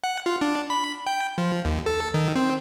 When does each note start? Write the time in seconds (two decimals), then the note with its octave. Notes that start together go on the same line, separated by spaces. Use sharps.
0.04 F#5
0.26 F4
0.41 D4
0.70 B5
1.07 G5
1.38 F3
1.65 D#2
1.86 A4
2.14 D#3
2.36 C4